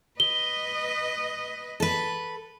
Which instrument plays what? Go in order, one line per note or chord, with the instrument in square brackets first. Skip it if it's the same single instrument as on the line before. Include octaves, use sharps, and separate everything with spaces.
[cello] B4 D#5 [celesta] G7
[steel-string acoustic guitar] A4 B4